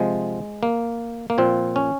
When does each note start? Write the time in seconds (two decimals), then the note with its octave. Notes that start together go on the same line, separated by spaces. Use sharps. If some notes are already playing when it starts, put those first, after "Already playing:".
Already playing: C3 F3 G#3
0.63 A#3
1.30 A#3
1.38 A#2 F3 C4
1.76 C#4